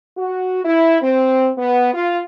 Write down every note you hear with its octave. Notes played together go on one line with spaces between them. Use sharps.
F#4
E4
C4
B3
F4